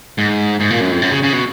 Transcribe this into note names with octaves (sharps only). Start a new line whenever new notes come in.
G#2
G#2
A#2
F#2
F2
F#2
C#3
C#3
B2